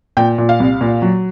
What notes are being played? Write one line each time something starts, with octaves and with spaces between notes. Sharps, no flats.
A#2 G5
A#2
F5
C2
A#2
F#3